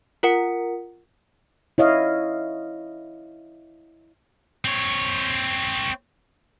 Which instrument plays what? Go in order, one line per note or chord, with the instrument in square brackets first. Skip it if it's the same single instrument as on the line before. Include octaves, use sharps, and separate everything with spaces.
[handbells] F4 A#4 F#5 C#7
[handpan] E4 C#5 D#5 F5
[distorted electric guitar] C4 C#5